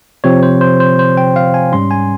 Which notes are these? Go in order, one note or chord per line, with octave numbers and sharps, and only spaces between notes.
C3 F3 C4 C#5
C5
C5
C5
C5
G5
F5
G#5
G#2 G3 C#4 C6
G#5